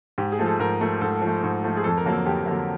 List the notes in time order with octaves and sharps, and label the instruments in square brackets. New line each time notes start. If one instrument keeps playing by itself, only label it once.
[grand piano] G#2 G4
G#4
F3 A3
A4
G#2 A#4
F3 A3
G#2 A4
F3
A3
G#2
F3 A3
G#4
F2 A4
A#4
D3 F#3 A#3
A4
F2 G4
D3 F#3 A#3